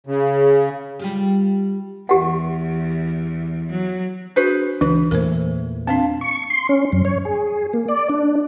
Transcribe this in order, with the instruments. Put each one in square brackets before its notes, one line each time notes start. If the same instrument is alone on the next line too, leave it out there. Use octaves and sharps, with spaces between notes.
[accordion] C#3
[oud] G3 F4 G4
[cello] E2 [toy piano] G4 F#5
[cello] F#3
[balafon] D4 F#4 [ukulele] G#4 B4 C5
[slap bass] C#2 D4 [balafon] E3 [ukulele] B4
[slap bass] E2 A#2 A3 [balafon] A#4 C5
[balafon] C4 D4 [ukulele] F4 F5 A5
[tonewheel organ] C#6
C6
C#4
F#2
C#5
G#4
A#3
D5
D4